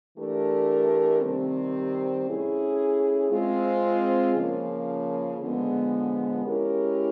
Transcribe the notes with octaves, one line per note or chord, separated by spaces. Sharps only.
E3 A3 D4 G4 A#4
C3 D#3 G3 C4
A3 C#4 E4 G#4
G#3 C4 F4
C#3 F3 A#3
D3 F3 G#3 B3
G#3 C#4 E4 G4 A#4